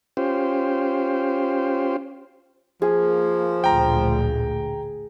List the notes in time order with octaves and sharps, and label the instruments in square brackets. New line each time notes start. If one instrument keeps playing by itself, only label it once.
[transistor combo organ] C#4 F4 G4 C5
[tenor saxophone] F3 [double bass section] A#3 [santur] G#4
[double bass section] A1 D2 A#2 [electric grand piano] G5 A#5